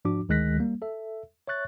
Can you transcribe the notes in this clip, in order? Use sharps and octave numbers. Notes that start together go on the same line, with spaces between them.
G#2 F3 D4 F#4 D6
D2 D#3 G#3 F#6 A#6 B6
G3 A#3
A4 E5
C#5 E5 C#6 F#6 A6